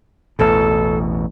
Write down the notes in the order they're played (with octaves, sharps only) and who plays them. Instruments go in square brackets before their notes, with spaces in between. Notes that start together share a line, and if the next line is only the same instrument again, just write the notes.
[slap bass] A1 E2 B2 [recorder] A4